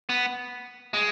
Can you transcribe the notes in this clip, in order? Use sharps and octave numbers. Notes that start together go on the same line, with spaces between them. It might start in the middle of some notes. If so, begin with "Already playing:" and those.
B3
G#3